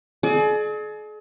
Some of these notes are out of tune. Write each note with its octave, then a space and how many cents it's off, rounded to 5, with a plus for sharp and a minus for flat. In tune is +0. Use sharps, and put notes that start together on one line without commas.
G#4 +40 D5 +40